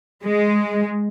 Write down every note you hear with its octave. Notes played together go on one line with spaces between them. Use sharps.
G#3